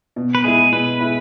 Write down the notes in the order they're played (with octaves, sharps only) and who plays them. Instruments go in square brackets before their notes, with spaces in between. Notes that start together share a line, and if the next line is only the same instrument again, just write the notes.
[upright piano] B2
[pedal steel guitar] B4
[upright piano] G#3 E4 [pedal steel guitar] G#4
[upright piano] B2 [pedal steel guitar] B4
[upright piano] G#3 E4